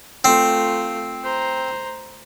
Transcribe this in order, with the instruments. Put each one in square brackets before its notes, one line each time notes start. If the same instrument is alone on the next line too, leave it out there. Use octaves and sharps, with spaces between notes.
[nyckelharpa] A3 F4 [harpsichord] C4
[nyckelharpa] C5 A#5